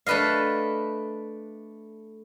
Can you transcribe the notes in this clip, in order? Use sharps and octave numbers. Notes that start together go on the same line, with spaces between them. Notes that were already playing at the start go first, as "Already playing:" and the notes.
A3 D4 B4 D#5 F5